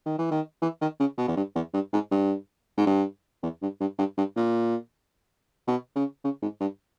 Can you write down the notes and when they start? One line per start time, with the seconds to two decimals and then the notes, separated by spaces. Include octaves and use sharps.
0.06 D#3
0.18 E3
0.31 D#3
0.62 E3
0.81 D#3
1.00 C#3
1.18 B2
1.28 E2
1.36 G2
1.55 E2
1.74 G2
1.93 G#2
2.11 G2
2.77 G#2
2.86 G2
3.43 E2
3.62 G2
3.80 G2
3.98 G2
4.17 G2
4.36 A#2
5.67 B2
5.95 C#3
6.24 C#3
6.42 G#2
6.60 G2